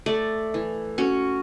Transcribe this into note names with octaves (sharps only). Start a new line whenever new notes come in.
A3 D5
E3
C#4 F#4 C#5